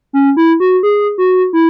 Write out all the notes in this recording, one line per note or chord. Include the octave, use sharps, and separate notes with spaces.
C#4
E4
F#4
G#4
F#4
E4